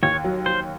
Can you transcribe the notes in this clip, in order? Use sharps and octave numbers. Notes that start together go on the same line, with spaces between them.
D#2 C#5
F#3
F#3 C5